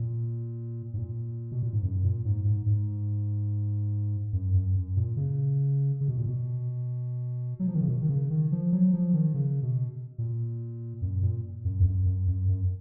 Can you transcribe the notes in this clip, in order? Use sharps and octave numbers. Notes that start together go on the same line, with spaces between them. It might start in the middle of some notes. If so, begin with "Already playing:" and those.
Already playing: A#2
G#2
A#2
B2
A#2
G#2
F#2
A#2
G#2
G#2
G#2
F#2
F#2
F#2
A#2
C#3
C#3
B2
A#2
B2
F#3
F3
D#3
C#3
B2
D#3
C#3
D#3
F3
F#3
F3
D#3
C#3
B2
A#2
F#2
A#2
F#2
F2
F#2
F#2
F#2
F#2